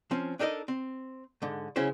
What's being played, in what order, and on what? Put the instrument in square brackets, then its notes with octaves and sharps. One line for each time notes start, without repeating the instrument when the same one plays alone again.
[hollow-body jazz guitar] F3 C4 C#4
D4 D#4 A4 A#4 D#5
C4
G#2 D3
C#3 F#3 C#4 E4 C5